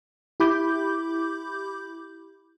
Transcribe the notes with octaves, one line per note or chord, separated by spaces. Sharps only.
E4 G4 B5 D6 G6